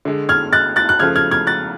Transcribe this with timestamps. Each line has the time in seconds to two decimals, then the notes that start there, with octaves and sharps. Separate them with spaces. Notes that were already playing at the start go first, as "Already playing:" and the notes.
0.05 D3 G#3
0.29 F6 G#6
0.53 F#6 A6
0.76 F#6 A6
0.89 F#6
0.99 C#3 F3 A3 F6 G#6
1.16 F6 G#6
1.31 F6 G#6
1.47 F#6 A6